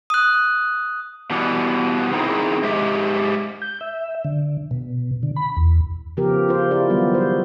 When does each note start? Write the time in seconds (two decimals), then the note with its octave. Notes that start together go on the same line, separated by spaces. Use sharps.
0.10 D#6 F#6
1.30 B2 E3 G3 B3
2.13 C4 D#4 E4 G#4 A#4
2.63 G#2 G#3 G4 E5
3.62 G6
3.81 E5
4.24 D3
4.71 B2
5.23 D3
5.36 B5
5.57 E2
6.17 C#3 F3 B3 G4 A#4
6.49 F4 C5
6.71 E4 F4 G4 A#4 D5
6.90 D#3 F#3 G3 B3
7.14 F#4 C5